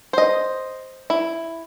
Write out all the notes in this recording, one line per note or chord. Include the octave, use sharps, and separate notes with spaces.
C5 D#5
E4